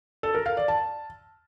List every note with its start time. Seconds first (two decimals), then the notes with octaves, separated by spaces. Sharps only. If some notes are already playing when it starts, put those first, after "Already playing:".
0.23 A4
0.35 A#4
0.46 F5
0.57 D5
0.68 A5